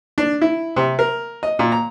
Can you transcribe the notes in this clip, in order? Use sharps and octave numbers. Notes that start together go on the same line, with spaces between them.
D4
E4
C3
A#4
D#5
A#2
A#5